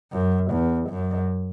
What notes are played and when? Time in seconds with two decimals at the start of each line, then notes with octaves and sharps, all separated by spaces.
0.12 F#2
0.51 E2
0.90 F#2